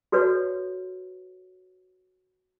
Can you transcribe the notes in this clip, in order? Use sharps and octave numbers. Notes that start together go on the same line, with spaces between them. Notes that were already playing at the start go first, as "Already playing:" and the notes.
F#4 A4 B4 C#5